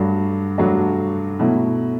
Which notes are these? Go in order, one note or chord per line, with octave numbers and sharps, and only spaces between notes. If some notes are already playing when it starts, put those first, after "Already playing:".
Already playing: G2 F#3 A3 D4 F#4
G2 F#3 A3 D4 F#4
B2 F#3 A3 E4